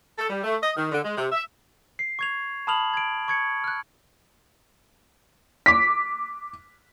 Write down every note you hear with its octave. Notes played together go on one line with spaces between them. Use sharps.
A4
G3
A3
D#5
D#3
D3
G#3
C3
E5
C7
C#6 G#6 F7
A5 B5 D#6 F6 F7 F#7
G#6 D7
C#6 G#6 C#7
F6 F#6
D6 B6